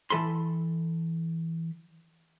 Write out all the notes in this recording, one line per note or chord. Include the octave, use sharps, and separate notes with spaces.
E3 A4 B5 C6